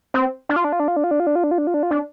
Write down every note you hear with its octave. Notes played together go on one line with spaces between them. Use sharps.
C4
D4
F4
D4
F4
D4
F4
D4
F4
D4
F4
D4
F4
D4
F4
D4
F4
D4
F4
D4